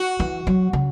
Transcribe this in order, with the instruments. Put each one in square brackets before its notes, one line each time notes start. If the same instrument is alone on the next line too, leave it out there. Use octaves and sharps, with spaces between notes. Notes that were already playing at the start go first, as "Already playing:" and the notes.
Already playing: [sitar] F#4
[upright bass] E3
F#3
C#3